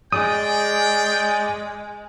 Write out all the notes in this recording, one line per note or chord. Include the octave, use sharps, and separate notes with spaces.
G#3 G#4 D5 G5 D#6